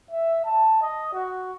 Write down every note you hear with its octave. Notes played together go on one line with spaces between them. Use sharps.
E5
A5
D#5
F#4